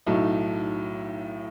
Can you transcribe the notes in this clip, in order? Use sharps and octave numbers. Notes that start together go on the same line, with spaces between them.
B1 A2 F#3 A3 D#4